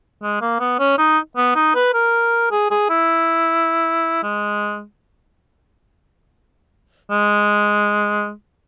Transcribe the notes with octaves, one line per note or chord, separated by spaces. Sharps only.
G#3
A#3
B3
C#4
D#4
B3
D#4
B4
A#4
G#4
G#4
E4
G#3
G#3